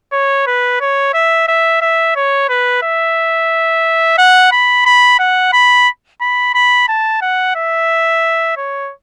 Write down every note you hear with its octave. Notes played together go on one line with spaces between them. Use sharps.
C#5
B4
C#5
E5
E5
E5
C#5
B4
E5
F#5
B5
B5
F#5
B5
B5
B5
A5
F#5
E5
C#5